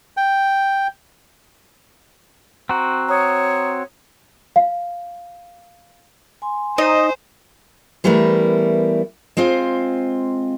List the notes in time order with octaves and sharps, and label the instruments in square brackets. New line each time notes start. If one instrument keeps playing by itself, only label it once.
[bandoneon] G5
[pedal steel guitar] C4 F#4 [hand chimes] F#5 A#5
[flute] C#5 [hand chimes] A#5 D#6
[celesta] F5
[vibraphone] G#5 C6
[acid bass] D#4 [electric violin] C5 [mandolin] D#5
[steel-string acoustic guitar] E3 G3 A3 B3 E4 A#4
G#3 C4 F4 C5